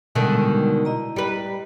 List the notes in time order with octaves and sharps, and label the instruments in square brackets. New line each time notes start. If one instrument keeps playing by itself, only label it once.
[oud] B2 D3 D#3 [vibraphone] G3 G#3
[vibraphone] E4 D#5 A#5
[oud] G3 B4